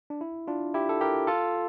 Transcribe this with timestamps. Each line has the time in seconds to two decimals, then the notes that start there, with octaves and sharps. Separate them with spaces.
0.10 D4
0.21 E4
0.47 D4 F4
0.74 E4 G4
0.89 A4
1.01 G4 A#4
1.27 F4 A4